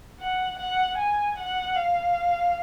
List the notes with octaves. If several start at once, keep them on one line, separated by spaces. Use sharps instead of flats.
F#5
F#5
G#5
F#5
F5